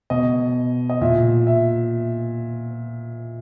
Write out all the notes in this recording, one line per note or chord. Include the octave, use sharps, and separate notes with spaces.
B2 D#5
D#5
A#2 E5
E5